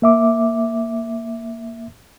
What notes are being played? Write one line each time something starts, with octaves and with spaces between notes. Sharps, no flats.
A#3 E5 D6